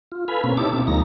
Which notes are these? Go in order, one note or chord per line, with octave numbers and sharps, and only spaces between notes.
F4
A4 B4 F5 G#5 B5
B2 A#3 C4 C#4
D#4 E4 G4 C#5 A5 D6
B2 C4
D2 F3 G#3 A#3 D#4 A#6